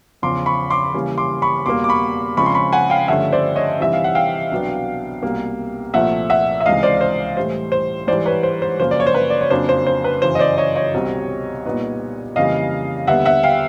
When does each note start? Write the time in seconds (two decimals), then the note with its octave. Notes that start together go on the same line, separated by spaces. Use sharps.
0.22 E2 C#3 F3 C6 D6
0.46 B5 C#6
0.70 C6 D6
0.94 C#3 E3 G3 A#3 C#4
1.18 C6 D6
1.42 B5 C#6
1.66 E2 B2 G3 A#3 C6 D6
1.84 D6
1.89 B5 C#6
2.37 C#3 F3 G#3 C4 B5 C#6
2.46 C6
2.55 B5 C#6
2.73 F#5 G#5
2.90 F5 G5
3.08 G2 D3 F3 A3 C#4 E5 F#5
3.33 C5 D5
3.56 C#5 D#5
3.79 C3 E3 G3 C4 D#4 E5
3.93 F5
4.04 F#5
4.15 F5 G5
4.51 C2 B2 F#3 B3 D4
5.22 C2 B2 G3 A#3
5.94 C2 A#2 F3 A3 E5 F#5
6.30 E5 F#5
6.61 E5
6.65 C#2 C3 E3 G#3 D#5 F5
6.83 C5 D5
7.01 C5
7.36 A2 E3 G3 C5
7.72 C5
8.07 G#2 E3 G3 C5 D5
8.26 B4 C#5
8.43 C5
8.62 C5
8.79 F#2 C#3 F3 A#3 C5
8.91 D5
9.00 C#5
9.07 C5
9.14 B4
9.30 D5
9.41 C#5
9.50 F2 C#3 F#3 A#3 D4 C5
9.69 C5
9.87 C5
10.04 B4
10.22 F#2 C#3 E3 C5
10.35 D#5
10.39 C5 D5
10.58 C#5 D#5
10.75 C#5 D#5
10.94 C2 B2 G3 C4
11.65 A#2 G3 B3 D#4
12.36 F2 C#3 E3 G3 A#3 D#5 F5
13.07 D#2 D3 G3 B3 E5 F#5
13.25 E5 F#5
13.43 F5 G5